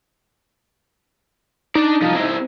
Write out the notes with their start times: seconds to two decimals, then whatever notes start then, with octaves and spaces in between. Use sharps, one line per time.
1.75 D4 D#4 D5
2.02 C2 F3
2.14 C4 E4